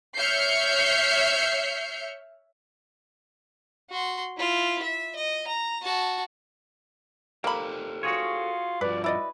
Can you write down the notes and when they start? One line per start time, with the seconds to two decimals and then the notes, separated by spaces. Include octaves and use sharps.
0.17 C#5 E5 F6 G6 C7 C#7
3.90 F#4 C6
4.37 E4 F4
4.82 E5
5.16 D#5
5.47 A#5
5.82 F#4 A5
7.44 A#3 G4 A4 C5 B5
8.03 F4 F#4 G#4 C#5
8.81 G2 F3 B4 D5
9.04 E4 B4 D5 D#5